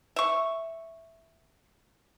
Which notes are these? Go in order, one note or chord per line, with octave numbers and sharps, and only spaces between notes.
E5 C#6